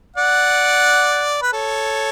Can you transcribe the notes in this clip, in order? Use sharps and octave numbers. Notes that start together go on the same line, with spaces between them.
D5 F#5
B4
A4 C#5